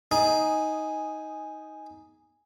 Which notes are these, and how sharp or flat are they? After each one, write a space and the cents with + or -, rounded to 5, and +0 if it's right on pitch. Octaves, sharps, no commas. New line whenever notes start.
D#4 +15 G#4 +0